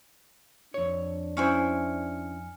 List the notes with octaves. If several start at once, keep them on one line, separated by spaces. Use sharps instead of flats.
F2 D4 C#5
C#4 E4 C5 G#5 F6 C#7